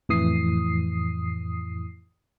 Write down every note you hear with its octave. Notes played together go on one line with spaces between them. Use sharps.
F2 A2 E3 D#6 C7